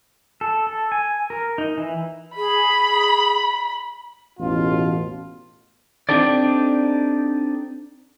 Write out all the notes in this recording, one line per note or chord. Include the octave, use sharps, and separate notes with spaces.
A4
A4
G#5
A#4
D#4
E3
G#4 B5
A1 E2 B2 F4
C4 D4 D#4 G4 A4 D5